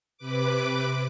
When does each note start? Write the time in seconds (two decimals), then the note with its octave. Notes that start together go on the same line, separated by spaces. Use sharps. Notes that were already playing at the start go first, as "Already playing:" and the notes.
0.18 C3 B4 D6